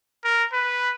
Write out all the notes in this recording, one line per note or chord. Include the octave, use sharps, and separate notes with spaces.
A#4
B4